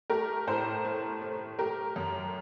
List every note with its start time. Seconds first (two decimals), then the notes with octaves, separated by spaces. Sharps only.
0.10 A3 G4 A#4
0.47 A2 A4 C5
0.85 A3
1.22 A3
1.59 A3 G4 A#4
1.96 F#2